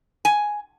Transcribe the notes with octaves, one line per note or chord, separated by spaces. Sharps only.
G#5